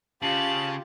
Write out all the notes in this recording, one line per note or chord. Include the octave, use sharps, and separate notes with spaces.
C#3 F4 G4 A5 F#7